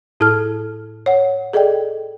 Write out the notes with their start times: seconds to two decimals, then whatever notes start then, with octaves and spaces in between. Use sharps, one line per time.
0.20 A2 E4 A4 A5 F6
1.06 C#5 F#5
1.53 G#4 A4 D5 D#5 G5